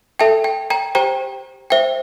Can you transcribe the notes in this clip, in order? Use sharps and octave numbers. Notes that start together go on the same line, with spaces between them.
A4 E5 G5 A5
G5
G5 A#5
G4 C5 G5 A#5
C5 E5 G5